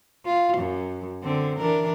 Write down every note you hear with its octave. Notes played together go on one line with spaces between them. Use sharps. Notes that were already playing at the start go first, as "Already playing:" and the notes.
F4
F#2
D3 C4
E3 D4 A#4